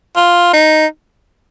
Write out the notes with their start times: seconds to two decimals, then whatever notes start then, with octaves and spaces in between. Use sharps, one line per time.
0.16 F4
0.53 D#4